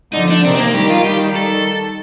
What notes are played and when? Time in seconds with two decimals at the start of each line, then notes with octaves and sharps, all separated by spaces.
0.13 D3 F3 D#4
0.30 D4
0.44 C3 D#3 C4
0.55 C4
0.60 A#3
0.74 D#3 G3 G4
0.90 F4
1.05 G4
1.36 A4